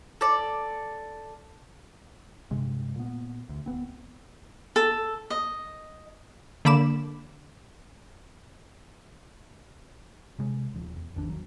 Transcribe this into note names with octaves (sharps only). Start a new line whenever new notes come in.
A4 D5
G2 C3 G#3
A#2 B3
D2
D1 B3 C4
A4
D#5
D3 A#3 B5 D6 E7
C3 G#3
D#1 F3
E2
G#1 E2 D#3 D4
F#3